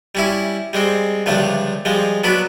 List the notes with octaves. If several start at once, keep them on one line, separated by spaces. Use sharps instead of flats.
G3 C#4 E4
G3 G#3 C4
C#2 D3 F3 G3 A3
F3 G3 G#3
F#3 B3 D4 B5